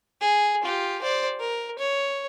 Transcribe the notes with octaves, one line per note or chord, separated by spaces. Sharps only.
G#4
F4 G4
C5 D5
A#4
C#5